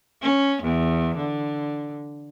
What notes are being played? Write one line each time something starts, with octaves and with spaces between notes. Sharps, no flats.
C#4
E2
D3